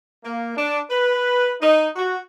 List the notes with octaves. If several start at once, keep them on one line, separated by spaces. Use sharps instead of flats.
A#3
D4
B4
D#4
F#4